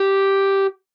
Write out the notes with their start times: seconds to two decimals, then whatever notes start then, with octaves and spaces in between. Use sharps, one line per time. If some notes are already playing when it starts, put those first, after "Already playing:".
Already playing: G4